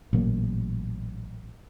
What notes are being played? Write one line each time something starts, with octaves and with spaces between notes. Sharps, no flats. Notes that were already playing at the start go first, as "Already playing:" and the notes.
A1 A#2 F#3 A#3